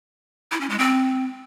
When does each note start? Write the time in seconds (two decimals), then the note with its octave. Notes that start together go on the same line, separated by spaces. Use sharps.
0.51 E4
0.61 C#4
0.70 G#3
0.79 C4